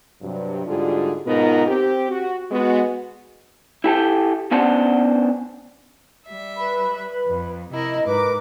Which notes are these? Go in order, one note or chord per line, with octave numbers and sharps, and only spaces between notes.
G2 C3 F#3
G#2 D3 G3 F4 F#4 G#4
G#2 B2 B3 D#4 F4 A#4
C4 G4
F#4
G#3 B3 F#4
E4 G4 A4 G5
B3 C#4 D4 C5 F#5 A5
G3 E5
B4 B5
F2
C3 E4 A#4 D#5
G#2 A#4 B4 D6